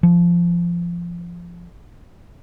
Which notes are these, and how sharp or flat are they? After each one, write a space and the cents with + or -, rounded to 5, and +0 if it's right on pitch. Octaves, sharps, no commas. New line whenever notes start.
F3 -15